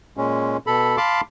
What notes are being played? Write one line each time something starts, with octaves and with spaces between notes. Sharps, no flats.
A#2 G#3 C#4
B2 A4 B5
F5 A5 B5 C6 D6